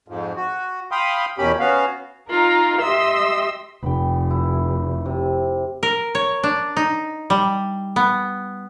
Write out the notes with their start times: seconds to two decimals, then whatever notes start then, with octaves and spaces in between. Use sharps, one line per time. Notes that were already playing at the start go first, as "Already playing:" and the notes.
0.08 F2 G#2 F3
0.36 F#4
0.91 F5 G5 B5 C6 D#6
1.38 E2 B2 A#3 C#4 G4 B5
1.59 B3 C#4 F#4 F5
2.29 D#4 F4 A#4 A#5
2.80 G4 D#5 E5 C6 E6
3.83 F1 G5 B5
4.31 E4
5.06 C3
5.83 A#4
6.15 C#5
6.43 D4
6.77 D#4
7.30 G3
7.96 B3